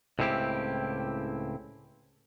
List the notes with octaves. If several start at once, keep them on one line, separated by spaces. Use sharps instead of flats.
C#2 A2 C#3 C4 E4 G4